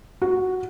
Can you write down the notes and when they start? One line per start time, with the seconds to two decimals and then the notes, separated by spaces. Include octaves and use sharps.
0.22 F#4